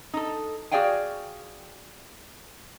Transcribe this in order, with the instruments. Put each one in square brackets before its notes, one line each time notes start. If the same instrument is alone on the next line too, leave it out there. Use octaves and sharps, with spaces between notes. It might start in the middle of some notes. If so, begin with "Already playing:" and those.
[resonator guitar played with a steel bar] D#4 A4
F#4 G#4 D5 F5 G5 G#5